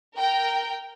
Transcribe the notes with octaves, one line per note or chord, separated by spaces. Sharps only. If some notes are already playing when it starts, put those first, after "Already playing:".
A#4 G5